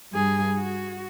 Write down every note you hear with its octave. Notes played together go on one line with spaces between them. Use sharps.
G2 G#4
F#4